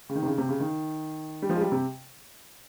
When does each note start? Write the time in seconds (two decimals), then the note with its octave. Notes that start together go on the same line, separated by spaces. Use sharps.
0.09 C#3
0.15 D#3
0.23 C3
0.26 C#3
0.38 C3
0.49 C#3
0.60 D#3
1.42 G3
1.49 F3
1.55 G#3
1.61 G3
1.72 C3